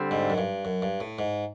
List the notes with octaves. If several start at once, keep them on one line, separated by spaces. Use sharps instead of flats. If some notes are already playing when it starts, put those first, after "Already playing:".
Already playing: D3 G3 C4
G#2
F#2
G2
F#2
G2
A2
G#2